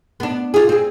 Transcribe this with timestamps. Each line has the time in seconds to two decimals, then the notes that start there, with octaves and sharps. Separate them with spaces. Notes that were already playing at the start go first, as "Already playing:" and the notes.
0.20 B3 D4
0.54 F4 G#4
0.69 C4 G#4